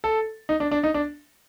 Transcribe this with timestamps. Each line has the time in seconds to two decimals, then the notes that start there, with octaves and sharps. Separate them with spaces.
0.04 A4
0.49 D#4
0.60 D4
0.71 D4
0.83 D#4
0.94 D4